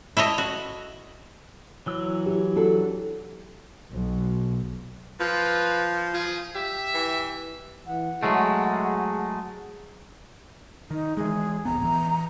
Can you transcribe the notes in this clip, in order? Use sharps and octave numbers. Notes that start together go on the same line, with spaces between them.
E4 A4 C#5 D#5
F#4
E3 F#3 E6
E4 G4
D4 F#4 A4
B1
F3 F4 B4
F4 G#4
G4 E5
E3
E3 F#5
F#3 G#3 A3 G#4
D#3 D#4
E3 G#3 G#4
D1 A#1 B3 A#5
E3